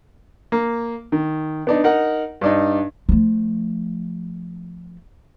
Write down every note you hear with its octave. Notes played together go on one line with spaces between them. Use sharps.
A#3
D#3
B3 D4 D#4
D#4 A#4 F#5
G2 D4 D#4
F3 A3